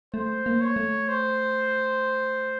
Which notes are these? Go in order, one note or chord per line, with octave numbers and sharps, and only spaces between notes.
A3 C5
A#3
C#5
A3
C5